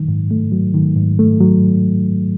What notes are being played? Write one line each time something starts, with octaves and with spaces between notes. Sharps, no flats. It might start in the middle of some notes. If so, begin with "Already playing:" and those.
Already playing: D#3 F#3
G#2
A3
F#3
D#3
G#2
A3
F#3